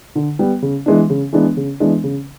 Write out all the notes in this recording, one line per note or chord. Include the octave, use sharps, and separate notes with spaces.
D3
G3 B3
C#3
E3 G#3 B3 D4
C#3
E3 G#3 B3 D4
C#3
E3 G#3 B3 D4
C#3